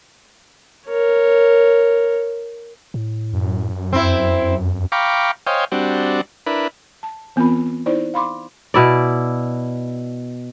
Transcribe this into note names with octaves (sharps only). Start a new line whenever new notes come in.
A#4 C#5
A2
F#2
F2 C4 E4
F5 G5 A#5 B5 C#6 D6
C5 C#5 D#5 F5 G5 G#5
G3 C4 D4 F#4
D4 E4 A#4 B4 B5
A5
E3 B3 C4 F4 A#4 B5
D#4 E4 C5 D5
F5 B5 C6 D6
B2 E4 D5